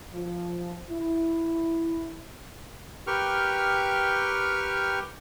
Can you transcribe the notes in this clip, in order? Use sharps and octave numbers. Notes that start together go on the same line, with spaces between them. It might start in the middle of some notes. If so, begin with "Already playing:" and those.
F3
E4
G4 A#4 B4 G5 C#6 F6